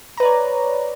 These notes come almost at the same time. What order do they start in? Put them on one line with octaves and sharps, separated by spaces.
A#5 B4 D5 C#5